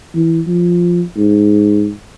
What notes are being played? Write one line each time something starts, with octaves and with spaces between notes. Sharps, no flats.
E3
F3
G#2